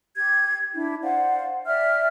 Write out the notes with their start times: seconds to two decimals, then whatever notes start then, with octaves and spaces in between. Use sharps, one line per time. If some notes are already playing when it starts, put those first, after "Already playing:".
0.16 G4 G#6
0.73 D4 E4
1.02 C5 D5 F5 F#5
1.67 D5 E5 G5 F6